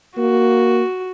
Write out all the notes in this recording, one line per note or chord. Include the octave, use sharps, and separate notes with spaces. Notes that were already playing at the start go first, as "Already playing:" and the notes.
A#3 F#4